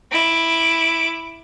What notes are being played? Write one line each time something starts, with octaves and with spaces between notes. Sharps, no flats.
E4 D6